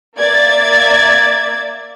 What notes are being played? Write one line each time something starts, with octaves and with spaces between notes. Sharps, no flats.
A#3 D5 E5 G#6 A6